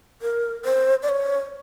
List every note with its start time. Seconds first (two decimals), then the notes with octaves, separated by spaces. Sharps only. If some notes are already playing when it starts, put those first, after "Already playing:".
0.22 A#4
0.65 C5
1.03 D5
1.09 C#5